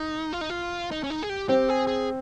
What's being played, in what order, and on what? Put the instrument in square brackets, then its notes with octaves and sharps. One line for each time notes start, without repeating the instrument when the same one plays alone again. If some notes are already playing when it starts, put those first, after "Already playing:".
Already playing: [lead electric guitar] D#4
F4
D#4
F4
D#4
C#4
D#4
G#4
G4
[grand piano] C4 [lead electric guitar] G4
[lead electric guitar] G#4
G#4